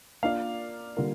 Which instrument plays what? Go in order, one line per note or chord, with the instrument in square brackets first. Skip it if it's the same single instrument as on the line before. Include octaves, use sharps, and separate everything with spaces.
[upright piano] A#3 D4 F4 D5 [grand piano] F5
[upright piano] D3 G3 A#3 F4 A#4